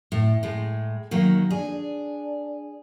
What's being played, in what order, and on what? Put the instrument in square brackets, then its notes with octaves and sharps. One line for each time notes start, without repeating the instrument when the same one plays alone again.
[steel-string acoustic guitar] A2
A2 G#3
D#3 F#3 A#3
[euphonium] D4 [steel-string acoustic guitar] G#4